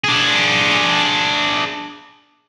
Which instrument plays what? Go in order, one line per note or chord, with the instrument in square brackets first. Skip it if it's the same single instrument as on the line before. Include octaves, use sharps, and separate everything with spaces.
[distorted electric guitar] D4 G#4